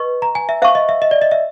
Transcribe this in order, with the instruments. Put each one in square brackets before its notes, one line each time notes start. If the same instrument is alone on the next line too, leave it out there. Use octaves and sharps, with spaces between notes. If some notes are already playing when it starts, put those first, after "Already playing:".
Already playing: [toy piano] B4 D#5 C#6
[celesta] A#5
G#5
E5
[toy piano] C5 F5 A5 C#6 [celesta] E5
[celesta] D#5
E5
D#5
D5
D#5
E5